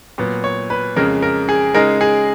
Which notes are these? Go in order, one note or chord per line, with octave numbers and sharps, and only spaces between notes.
A#2 F#3 B3
C#5
B4
F2 C#3 G#3 A#4
A#4
G#4
C#3 G#3 D#4 A#4
G#4